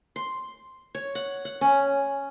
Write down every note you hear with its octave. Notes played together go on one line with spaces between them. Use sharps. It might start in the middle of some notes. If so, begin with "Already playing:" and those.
C6
C#5
F#5
F#5
C#4